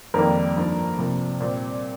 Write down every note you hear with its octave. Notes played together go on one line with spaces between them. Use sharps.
F2 D#3 G3 A#3 A#4
G2 F3 A#3
C3 F3 A#3
A#2 G3 C4